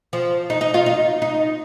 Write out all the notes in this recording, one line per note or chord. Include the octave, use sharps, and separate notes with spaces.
F3
D#4
D#4
F4
D#4
D#4